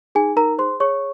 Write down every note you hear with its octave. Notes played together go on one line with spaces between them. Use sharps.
D#4 G#4 G#5
D#4 A#4 A#5
G#4 C5 C6
G#4 C#5 C#6